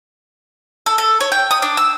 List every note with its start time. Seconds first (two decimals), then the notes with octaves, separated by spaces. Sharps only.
0.86 A4
0.98 A4
1.20 C#5
1.32 G5
1.51 D#6
1.62 D4
1.77 E6